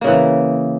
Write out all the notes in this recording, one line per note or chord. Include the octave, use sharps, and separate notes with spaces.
C#3 E3 A#3